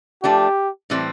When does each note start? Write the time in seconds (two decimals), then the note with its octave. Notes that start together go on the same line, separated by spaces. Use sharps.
0.23 F3 A3 D4 G4
0.90 A2 E3 G3 C4